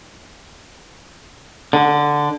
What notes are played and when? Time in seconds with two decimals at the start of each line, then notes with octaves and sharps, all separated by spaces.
1.73 D3